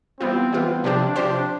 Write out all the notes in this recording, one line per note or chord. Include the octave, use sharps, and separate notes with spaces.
E3 G3 B3 C4 F4
E3 G3 B3 F4
C3 F3 C4 D4 G4 C5
C3 F3 C4 D4 G4 C5